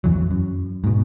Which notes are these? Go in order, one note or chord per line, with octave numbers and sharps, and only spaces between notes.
A#1 F2 E3 F#3
F#2
G#2 B2